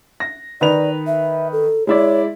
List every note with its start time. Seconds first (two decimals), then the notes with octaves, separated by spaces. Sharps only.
0.20 A#6
0.61 D#3 B4 D5 F7
1.07 E5
1.53 A4
1.87 G#3 E4 C#5 D5